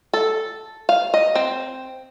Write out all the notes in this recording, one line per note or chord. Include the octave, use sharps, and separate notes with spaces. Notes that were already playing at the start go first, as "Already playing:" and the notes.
A4
F5
D#5
C4